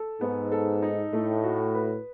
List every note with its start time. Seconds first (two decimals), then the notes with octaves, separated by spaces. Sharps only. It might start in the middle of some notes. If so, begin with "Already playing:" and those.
Already playing: A4
0.21 G#2 B3
0.52 A4
0.82 D#4
1.13 A2 A3
1.44 F#4
1.74 B4